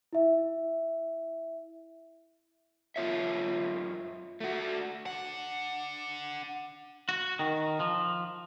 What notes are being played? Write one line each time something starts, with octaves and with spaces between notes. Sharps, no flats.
E4 E5
F#2 F4 C#5 E5
A3 F#4
D4 F#5
F#4
D#3
F3